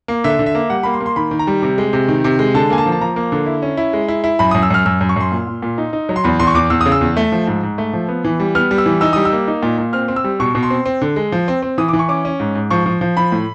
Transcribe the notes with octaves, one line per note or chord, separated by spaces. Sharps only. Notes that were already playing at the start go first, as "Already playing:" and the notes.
A#3
D3 E5
D3
E5
A#3
G3 F#5
A#3 B5
C6
A#3
C6
D#3 B5
D#3
A#5
G3
C3
G#3
C3
D#3
C3
G#3
D3 A5
A#3 G#5
A5
F3
A5
F3 A#5
A#3
D3
E4
C#4
E4
G#3
E4
E4
F#2 B5
F#2 D#6
E6
F#2 F6
F#2 E6
F#2
C#6
F#2 C6
A#2
A#2
A#2
D#4
D#4
F#3
C6
E2 B5
E2 C6
C#6
E2 D6
E2 E6
C#3 D#6
E6
E2
A3
F3
G#2
G#2
A3
F3
B3
E3
G3
B3 F6
G3
E6
E3
D#4 E6
G3 D#6
E6
A#3
D#4
A#2
A#2
C4 F6
C4
E6
G3
B2 C#6
B2
C6
C4
C4
D3
G#3
F3
C4
C4
E3 D#6
E3 D6
C#6
C#4 D6
C#4
G#2
G#2
F3 C#6
F3
F3
F3 B5
A2